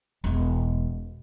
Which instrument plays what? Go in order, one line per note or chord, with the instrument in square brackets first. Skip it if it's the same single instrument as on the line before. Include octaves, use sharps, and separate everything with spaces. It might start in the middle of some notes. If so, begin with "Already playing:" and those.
[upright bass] E1 B2